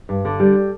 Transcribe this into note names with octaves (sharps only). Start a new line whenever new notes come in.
G2
D3
G3